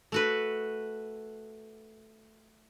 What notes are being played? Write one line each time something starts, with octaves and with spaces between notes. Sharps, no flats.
A3 F#4 B4